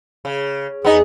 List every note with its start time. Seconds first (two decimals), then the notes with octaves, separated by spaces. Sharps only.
0.25 C#3
0.84 E2 B3 D#4 G#4